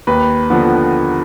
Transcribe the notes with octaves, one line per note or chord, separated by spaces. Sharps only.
D#2 B4
D3 F3 B3